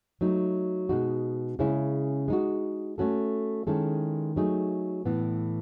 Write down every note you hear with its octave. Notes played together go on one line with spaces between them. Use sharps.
F#3 A3 D#4
B2 G#3 D#4 F#4
C#3 G#3 C#4 E4
G#3 D#4 F#4
A3 C#4 F#4 A4
D#3 G#3 C#4 E4 A4
F#3 A3 D#4 G#4
A2 E3 B3